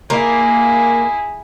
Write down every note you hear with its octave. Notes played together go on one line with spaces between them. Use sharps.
A#3 E4 G#4